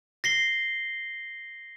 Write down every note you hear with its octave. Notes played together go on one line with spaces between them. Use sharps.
A#6 C7 G7